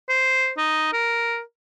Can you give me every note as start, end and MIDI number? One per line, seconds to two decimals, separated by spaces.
0.09 0.51 72
0.57 0.90 63
0.93 1.40 70